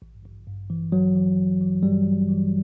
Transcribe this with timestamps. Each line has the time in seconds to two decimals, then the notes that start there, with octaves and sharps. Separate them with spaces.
0.02 A1
0.25 A1
0.47 G2
0.70 E3
0.92 G2 F#3
1.15 E3
1.38 A1
1.61 E3
1.83 G2 G3
2.06 A1
2.28 E3